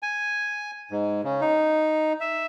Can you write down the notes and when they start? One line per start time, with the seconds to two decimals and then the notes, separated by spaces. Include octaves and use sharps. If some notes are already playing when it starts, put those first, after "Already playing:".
0.03 G#5
0.91 G#2
1.24 C#3
1.41 D#4
2.21 E5